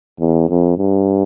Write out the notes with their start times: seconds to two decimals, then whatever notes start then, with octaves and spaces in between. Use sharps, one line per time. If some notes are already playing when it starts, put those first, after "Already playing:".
0.20 E2
0.49 F2
0.78 G2